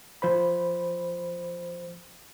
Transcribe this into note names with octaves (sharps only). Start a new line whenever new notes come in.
F3 C5 B5